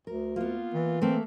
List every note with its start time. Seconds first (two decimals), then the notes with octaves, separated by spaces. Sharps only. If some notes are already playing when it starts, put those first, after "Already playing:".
0.07 D2 A#4
0.36 A#3 B3 F4
0.74 E3
1.02 A3 A#3 C4